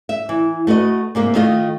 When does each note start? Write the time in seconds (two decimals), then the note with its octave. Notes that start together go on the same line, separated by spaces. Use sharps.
0.09 E5
0.29 E3
0.67 A3 F#4 B4 D#5
1.15 G#2 C3 A#3
1.35 D#3 A3 F4 D#5